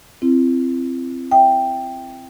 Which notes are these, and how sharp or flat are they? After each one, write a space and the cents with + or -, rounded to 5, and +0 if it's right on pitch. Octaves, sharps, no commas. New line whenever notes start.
C4 +0 E4 +40
E5 +0 G5 +0